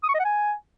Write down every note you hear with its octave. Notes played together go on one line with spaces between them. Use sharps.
D#6
C#6
D#5
F#5
G#5